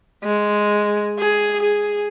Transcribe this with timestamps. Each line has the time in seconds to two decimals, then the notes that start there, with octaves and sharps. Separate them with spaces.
0.24 G#3
1.19 G#4
1.62 G#4